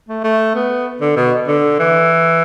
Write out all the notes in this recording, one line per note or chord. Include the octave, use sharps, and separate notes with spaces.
A3
A3
B3
D3
B2
D3
E3